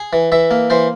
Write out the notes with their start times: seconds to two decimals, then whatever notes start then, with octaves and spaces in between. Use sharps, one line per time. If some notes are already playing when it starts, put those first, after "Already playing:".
Already playing: G#4
0.13 E3
0.32 E3 E5
0.51 A#3
0.70 E3 C5